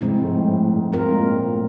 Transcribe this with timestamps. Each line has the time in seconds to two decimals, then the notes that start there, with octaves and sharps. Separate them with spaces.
0.01 G#2 C3 F3 G#3 C4 E4
0.24 A2
0.48 A2
0.70 G#2
0.92 A2 G#3 C4 F4 A#4
1.16 A#2
1.38 A2